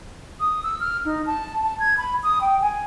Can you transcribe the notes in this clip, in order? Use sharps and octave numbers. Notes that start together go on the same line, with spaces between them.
D#6
E6
F6
D#4
A5
A5
G#6
B5
D#6
G5
G#5